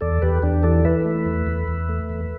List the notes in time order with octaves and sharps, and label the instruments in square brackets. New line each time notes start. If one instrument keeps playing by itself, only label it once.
[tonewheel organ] E2 A4 D5
E2 G4 B4
E2 D4 G4
E3 A4 D5
E3 B4 E5
A3
E2
E2
E2
A3
E2